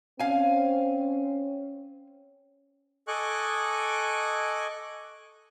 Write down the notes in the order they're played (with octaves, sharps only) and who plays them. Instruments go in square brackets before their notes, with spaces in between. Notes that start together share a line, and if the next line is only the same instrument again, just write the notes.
[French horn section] C4 C#4 [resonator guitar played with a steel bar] F5 G#5
[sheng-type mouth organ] A4 D#5 G#5 C#6 D6 F#6